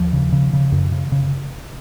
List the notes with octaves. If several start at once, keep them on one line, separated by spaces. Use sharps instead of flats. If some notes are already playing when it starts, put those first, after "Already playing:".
Already playing: D#2 F3
C#3
C#3
C#3
F#2
C#3
C#3